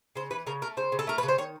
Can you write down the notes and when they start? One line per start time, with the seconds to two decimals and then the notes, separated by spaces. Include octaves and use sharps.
0.16 C#3 C5
0.31 E3 B4
0.47 C#3 A#4
0.62 A3 A#4
0.77 C#3 C5
0.92 C#3
0.99 A4
1.07 A3 A#4
1.18 B4
1.23 C#3
1.28 C5
1.38 D#3 C#5